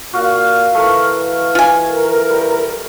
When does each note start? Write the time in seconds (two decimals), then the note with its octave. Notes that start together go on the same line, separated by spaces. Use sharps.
0.13 A#2 F#4 F5
0.74 E3 A3 A#4
1.55 F4 G#5
1.90 A#4
2.30 G3